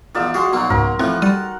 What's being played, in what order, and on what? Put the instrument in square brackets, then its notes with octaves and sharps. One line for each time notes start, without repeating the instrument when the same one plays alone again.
[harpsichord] E2 D#3 [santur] F4 D5 E5
[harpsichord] G#3 G#4 [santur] F#4 F5 C6
[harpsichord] B2 F#3 A#3 [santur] D#4 F#4
[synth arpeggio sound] C#2 G#2 [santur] A#4
[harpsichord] A2 E3 F3 [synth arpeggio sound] C4 [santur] F#5
[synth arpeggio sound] G3 [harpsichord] A4